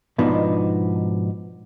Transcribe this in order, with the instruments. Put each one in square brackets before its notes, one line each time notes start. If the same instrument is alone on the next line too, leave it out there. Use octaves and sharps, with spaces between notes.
[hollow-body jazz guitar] G#2 B2 F3 B3 D4 D#4